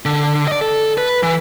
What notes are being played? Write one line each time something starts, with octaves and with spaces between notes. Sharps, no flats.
D3
D5 D#5
A4
B4
E3